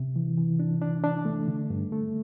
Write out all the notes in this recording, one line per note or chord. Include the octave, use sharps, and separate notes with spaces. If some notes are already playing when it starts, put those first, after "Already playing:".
Already playing: C3
E3
E3
D4
D4
D4
A3
D3
G2
A3